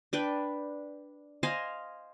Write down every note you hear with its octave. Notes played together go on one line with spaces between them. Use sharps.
D4 B4 G5
C5 D#5 F5 G#5